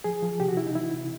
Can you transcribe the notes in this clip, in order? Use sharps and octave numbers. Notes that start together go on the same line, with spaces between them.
F3 G#4
F3
C3 G4
F#4
C3 E4
D#4
E3 E4
C3